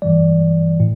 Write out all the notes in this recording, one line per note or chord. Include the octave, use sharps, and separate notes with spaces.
G2 E3 G3 D5
A2